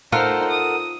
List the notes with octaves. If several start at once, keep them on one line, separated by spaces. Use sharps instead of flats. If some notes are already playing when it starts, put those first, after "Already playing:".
D#4 F4 A4 A#4 C5 F#5
D#6